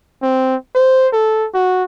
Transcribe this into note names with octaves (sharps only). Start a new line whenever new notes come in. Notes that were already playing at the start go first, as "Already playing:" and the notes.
C4
C5
A4
F#4